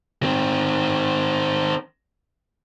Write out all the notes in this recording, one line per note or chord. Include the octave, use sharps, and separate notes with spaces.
D#3 C4